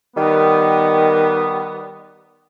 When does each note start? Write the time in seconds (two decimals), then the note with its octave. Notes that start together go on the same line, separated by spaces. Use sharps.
0.17 D#3 G3 B3